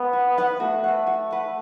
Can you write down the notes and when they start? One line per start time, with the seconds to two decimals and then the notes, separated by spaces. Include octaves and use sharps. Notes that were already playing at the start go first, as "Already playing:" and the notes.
Already playing: B3
0.13 F#4
0.38 B4 F#5
0.60 A3 F#4
0.84 B4 F#5
1.07 F#4
1.31 B4 F#5